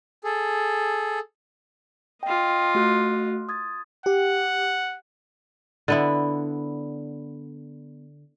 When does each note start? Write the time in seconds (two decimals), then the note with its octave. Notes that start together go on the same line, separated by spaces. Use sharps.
0.24 G#4 A4
2.23 F4 D#5 G5
2.75 A3 F#4 F#6
3.49 D#6 G#6 A6
4.06 G4 F#5
5.88 D3 B3 E4